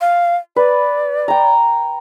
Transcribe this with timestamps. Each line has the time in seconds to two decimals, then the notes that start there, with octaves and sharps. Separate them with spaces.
0.01 F5
0.56 B4 D5
1.28 G5 A#5